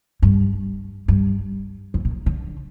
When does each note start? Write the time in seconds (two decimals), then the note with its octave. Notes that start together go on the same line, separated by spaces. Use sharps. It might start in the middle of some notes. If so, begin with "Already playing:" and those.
0.22 G2
1.08 G2
1.94 F2
2.05 A#2
2.26 D3